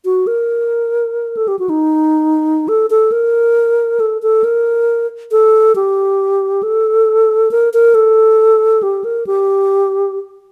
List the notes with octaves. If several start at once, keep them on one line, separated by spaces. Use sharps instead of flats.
F#4
A#4
A4
G4
F#4
D#4
A4
A4
A#4
A4
A4
A#4
A4
G4
A4
A#4
A#4
A4
G4
A#4
G4